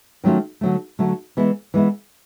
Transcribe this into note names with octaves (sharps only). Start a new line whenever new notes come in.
D#3 F#3 A3 C#4 F4
D3 F#3 A3
D3 F#3 A3
E3 G#3 B3 E4
E3 G#3 B3 E4